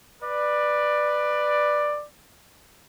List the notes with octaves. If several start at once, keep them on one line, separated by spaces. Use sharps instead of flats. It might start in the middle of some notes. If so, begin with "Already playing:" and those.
B4 D5